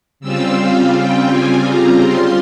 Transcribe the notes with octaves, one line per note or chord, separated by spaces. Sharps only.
C#3 G3 C4 F4 E6
F5
G5
G#5
A#5
C6